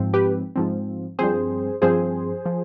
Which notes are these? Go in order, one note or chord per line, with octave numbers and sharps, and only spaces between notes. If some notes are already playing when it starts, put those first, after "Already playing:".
Already playing: G#2 F3 C4
G4 B4
G#2 F3 C4
G2 F3 C4 G#4 C5
G2 F3 C4 G#4 C5
F3